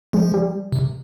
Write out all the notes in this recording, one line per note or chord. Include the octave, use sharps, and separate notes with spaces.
F3 G#3
G3
C3